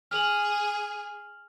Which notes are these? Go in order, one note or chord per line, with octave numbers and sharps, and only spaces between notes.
G#4 F6 F7 F#7